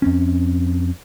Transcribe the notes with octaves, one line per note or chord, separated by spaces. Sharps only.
F2 C4 C#4